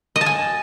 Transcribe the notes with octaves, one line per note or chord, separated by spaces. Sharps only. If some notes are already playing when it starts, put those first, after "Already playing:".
D#5
A5
G#5